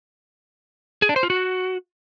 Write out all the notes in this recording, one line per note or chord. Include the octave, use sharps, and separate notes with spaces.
G#4
D4
C5
F4
F#4